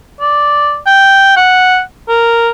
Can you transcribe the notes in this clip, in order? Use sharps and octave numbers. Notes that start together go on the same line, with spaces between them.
D5
G5
F#5
A#4